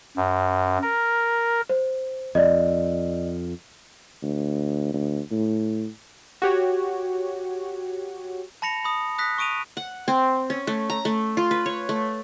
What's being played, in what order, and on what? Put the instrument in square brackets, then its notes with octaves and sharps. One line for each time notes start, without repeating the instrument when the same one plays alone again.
[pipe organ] F#2
A#4
[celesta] C5
[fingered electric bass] F2 [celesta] D5 D#5
[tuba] D2
D2
A2
[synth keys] F#4 G4 C#5
[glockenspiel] A5 B5 A#6 C#7 F7
B5 D#6
D#6 F#6 A#6 B6
C#6 D#6 D7 D#7 F7
[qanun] F#5
C4
C#4
A3
A#5
A3
F4
B4
C#5
A3